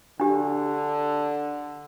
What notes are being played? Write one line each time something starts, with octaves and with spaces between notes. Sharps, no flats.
D3 D4 G4